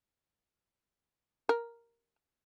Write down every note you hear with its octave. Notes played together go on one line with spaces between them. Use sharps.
A#4